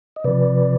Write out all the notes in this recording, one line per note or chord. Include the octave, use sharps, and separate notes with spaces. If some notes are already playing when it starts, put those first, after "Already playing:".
D#5
C3 F3 B4 D5